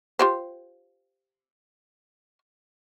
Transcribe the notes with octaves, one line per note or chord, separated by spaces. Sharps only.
F4 G4 C5